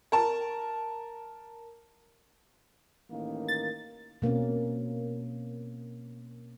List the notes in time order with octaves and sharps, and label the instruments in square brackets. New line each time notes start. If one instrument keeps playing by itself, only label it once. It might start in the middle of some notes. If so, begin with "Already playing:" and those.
[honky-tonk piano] A#4 A5
[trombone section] A1 D#3 A#3
[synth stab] A6
[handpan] B2 A#3 C4 C#4